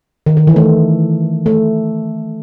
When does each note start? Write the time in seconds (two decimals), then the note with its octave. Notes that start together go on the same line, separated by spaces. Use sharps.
0.26 D#3
0.37 D#3
0.47 E3
0.56 A3
1.46 A3